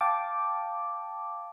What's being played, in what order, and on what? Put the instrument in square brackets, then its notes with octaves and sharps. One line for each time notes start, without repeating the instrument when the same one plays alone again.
[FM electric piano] F5 G5 A5 D6